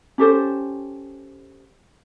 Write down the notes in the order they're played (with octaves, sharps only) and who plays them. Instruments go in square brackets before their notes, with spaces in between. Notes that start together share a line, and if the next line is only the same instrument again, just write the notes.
[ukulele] C#4 G4 A4 C5